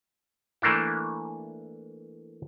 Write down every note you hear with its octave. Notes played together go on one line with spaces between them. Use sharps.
E3 A3 A#3 D4 E4